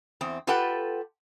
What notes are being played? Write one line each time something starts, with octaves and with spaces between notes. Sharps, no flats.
E2 C4
F4 G4 A4 B4 F#5 G5